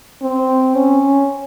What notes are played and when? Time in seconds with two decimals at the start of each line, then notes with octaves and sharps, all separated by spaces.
0.22 C4
0.75 C#4